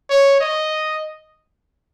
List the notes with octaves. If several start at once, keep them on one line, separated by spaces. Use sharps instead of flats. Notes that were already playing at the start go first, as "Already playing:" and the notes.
C#5
D#5